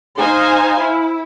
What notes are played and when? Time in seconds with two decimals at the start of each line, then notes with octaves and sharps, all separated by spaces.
0.18 D#4 C5 F5 G#5 C6
0.80 E4